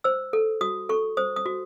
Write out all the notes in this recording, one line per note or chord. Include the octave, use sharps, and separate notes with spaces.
C5 E6
A4
F#4 D#6
A4 C#6
C5 D#6
D#6
F#4